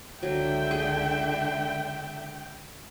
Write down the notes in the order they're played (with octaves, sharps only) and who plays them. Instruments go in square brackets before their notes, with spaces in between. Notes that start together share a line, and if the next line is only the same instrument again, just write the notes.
[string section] C#2 D3 E5 [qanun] F#3 [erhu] G5
[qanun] G#4